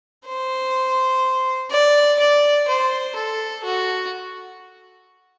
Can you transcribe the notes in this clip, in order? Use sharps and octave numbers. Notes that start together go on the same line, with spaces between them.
C5
D5
D5
C5
A4
F#4